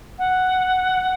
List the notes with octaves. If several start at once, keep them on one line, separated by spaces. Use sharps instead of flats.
F#5